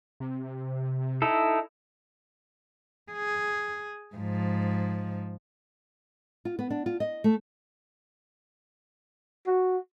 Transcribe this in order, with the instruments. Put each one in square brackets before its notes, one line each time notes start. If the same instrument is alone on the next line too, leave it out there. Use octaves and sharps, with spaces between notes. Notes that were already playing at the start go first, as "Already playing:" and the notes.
[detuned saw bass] C3
[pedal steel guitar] D#4 E4 A4
[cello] G#4
G#2 F3
[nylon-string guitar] F4
B3
D4
F4
D#5
A3
[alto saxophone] F#4